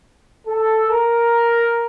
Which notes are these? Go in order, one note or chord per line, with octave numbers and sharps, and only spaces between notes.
A4
A#4